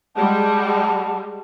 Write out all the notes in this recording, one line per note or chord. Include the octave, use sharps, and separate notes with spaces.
G3 G#3 F#5 A5